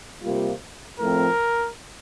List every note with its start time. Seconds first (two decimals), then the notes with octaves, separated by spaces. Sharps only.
0.22 C3 G3 A#3 F4
0.99 A2 F3 C4 A#4